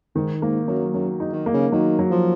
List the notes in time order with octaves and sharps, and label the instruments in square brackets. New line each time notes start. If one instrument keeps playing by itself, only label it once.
[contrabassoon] G#2 [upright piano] D#3
[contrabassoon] G#2 [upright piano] A#3
[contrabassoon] F#2 [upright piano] F#3
[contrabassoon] F#2 [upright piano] F#3
[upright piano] D#4
[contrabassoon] D#3
[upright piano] A#3
[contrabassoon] C#3
[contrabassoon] D#3 [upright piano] F#3
[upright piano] F#3
[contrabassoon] F3